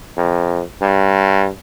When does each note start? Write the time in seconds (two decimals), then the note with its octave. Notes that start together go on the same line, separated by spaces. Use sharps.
0.17 F2
0.82 G2